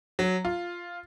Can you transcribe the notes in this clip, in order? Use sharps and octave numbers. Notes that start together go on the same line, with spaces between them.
F#3
F4